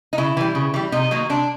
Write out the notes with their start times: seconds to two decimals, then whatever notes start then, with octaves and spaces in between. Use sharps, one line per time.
0.13 D#4
0.18 C#3 E4
0.37 E3 G3
0.55 C#3
0.74 E3 G3
0.92 C3 D#4
1.11 D#3 F#3 A#3
1.29 C3 D4